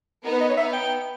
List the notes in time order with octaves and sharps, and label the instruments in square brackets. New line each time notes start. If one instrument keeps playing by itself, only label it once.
[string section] B3 D#4 [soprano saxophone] A#4
[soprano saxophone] B4
D#5
C#5
[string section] B3 D#4 [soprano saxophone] E5
[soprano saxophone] G5